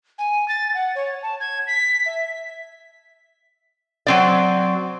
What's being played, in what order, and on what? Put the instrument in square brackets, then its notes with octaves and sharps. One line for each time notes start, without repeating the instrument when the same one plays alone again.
[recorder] G#5
A6
F#5
C#5
A5
G#6
B6
E5
[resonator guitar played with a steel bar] F#3 C4 D5